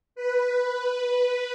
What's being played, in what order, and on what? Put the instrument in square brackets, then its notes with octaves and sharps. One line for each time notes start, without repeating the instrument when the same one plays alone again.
[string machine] B4